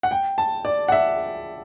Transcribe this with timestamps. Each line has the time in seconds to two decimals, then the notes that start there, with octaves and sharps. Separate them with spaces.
0.03 F#5
0.11 G5
0.38 A5
0.65 D5
0.88 F#5
0.92 E5